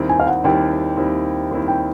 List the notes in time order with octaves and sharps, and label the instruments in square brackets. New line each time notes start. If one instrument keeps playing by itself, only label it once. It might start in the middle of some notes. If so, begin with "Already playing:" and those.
Already playing: [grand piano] D#2 D#3 G3 C4 E4
[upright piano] G#5
F5
F#5
[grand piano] D#2 D#3 G3 C4 E4 [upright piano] G5
[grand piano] D#2 D#3 G3 C4 E4
D#2 D#3 G3 C4 E4
[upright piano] G5